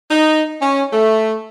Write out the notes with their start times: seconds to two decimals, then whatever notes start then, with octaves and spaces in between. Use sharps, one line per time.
0.11 D#4
0.61 C#4
0.93 A3